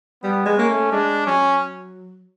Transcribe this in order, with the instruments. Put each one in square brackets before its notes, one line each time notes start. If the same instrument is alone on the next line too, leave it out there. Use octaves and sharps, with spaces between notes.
[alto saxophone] G3 [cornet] B3
[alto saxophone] G#3
[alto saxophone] A#3 [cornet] C#4
[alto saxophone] A3
[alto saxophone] G#3 [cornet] D4
[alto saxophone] F#3 [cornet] C#4